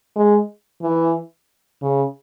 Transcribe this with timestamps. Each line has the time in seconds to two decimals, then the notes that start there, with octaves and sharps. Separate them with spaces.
0.16 G#3
0.82 E3
1.82 C#3